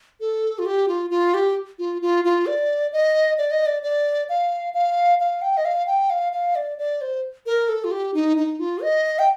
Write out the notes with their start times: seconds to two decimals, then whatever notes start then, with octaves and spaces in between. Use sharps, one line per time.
0.20 A4
0.59 F4
0.65 G4
0.88 F4
1.10 F4
1.34 G4
1.79 F4
2.02 F4
2.25 F4
2.46 D5
2.93 D#5
3.38 D5
3.51 D#5
3.66 D5
3.83 D5
4.29 F5
4.74 F5
5.20 F5
5.42 G5
5.57 D#5
5.65 F5
5.87 G5
6.10 F5
6.33 F5
6.55 D5
6.78 D5
7.01 C5
7.46 A#4
7.69 A4
7.84 F4
7.91 G4
8.14 D#4
8.37 D#4
8.59 F4
8.82 D#5
9.19 G5